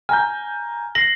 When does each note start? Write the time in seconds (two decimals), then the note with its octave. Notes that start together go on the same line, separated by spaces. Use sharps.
0.09 G#5 A#5 F6 G6
0.95 A#6 C7 F#7